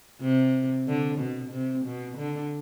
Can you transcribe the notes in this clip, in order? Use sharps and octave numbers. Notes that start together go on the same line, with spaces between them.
C3
D3
B2
C3
B2
D3